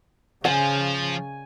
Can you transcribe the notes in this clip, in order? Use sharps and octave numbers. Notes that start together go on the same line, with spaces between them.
C#3 F3 G#5